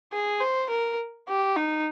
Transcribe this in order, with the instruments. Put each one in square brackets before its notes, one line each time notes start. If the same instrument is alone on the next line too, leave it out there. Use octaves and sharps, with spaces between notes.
[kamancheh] G#4
C5
A#4
G4
D#4